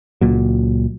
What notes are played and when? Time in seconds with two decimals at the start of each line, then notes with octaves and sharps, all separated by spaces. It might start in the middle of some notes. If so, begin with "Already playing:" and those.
0.21 C#2 A#2 F#3